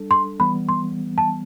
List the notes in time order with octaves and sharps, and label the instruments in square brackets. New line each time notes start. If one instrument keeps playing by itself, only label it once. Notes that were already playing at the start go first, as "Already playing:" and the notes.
Already playing: [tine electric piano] G3 D4 A4
[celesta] C6
[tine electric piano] E3 G3 B3 [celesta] B5
[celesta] C6
A5